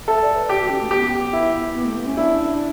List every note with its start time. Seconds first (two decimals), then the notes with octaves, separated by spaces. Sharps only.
0.07 A4 E5
0.22 D5
0.36 B4
0.49 G4
0.60 F#4
0.70 C#4
0.81 A3
0.91 B3 G4
1.33 E4
1.75 B3
1.85 A3
1.96 B3
2.06 C#4
2.17 D4 E4